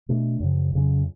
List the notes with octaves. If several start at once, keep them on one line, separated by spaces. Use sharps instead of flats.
B2 A3 D4
F#2 C#3 F3
F2 C#3 F#3 C#4